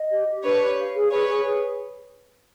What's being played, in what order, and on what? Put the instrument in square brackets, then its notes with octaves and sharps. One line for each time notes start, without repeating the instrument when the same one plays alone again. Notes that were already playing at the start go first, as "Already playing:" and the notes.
Already playing: [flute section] D#5
G4
G4
[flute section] D4 [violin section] B4 C#5
[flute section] G4
F5
G#4
[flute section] G#4 [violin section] B4 C#5
[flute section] G#4
G#4